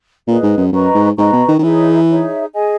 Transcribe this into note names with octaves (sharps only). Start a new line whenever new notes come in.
A#2 G#4 B4 D#5
G#2
F#2
F#2 B4 D#5 A#5 C#6
G#2
G#2 B4 D#5 A#5 C#6
B2
D#3
D#3
E3 D#4 G#4 C#5 E5
D#4 G#4 C#5 E5
G#4 D#5 G#5